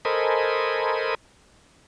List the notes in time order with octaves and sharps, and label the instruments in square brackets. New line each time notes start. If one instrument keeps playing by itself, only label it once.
[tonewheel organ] A4 A#4 C5 D#5 G#5 B5